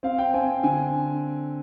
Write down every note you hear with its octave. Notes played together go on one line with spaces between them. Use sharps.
C4 F5
G5
C4 G#5
D3 G#5